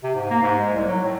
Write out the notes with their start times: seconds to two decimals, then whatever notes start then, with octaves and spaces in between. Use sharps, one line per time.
0.03 C3
0.15 G#2
0.31 A#3
0.42 G#2
0.59 G#3
0.73 C2
0.88 F#3
1.04 A2